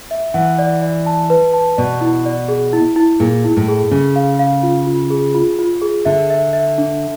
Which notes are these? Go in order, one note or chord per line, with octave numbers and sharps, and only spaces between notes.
E5
E3 F#5
D5
D5
A5
B4
A5
B2 D5
E4
D5
G#4
E4
E4
A#2 G#4
E4
A2
G#4
C#3 G#4
F5
F5
F4
F4
G#4
F4
F4
G#4
D3 E5
E5
E5
D4